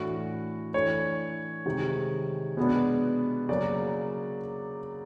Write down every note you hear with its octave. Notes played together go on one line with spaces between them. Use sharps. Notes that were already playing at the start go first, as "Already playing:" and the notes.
Already playing: A2 E3 A3 D4 F#4
E3 A3 D4 C#5
C3 D#3 G#3
B2 G#3 B3 D4
C#3 F#3 A#3 D5